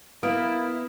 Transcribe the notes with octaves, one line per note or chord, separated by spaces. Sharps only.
A#3 B3 E4 D#6 F6 D7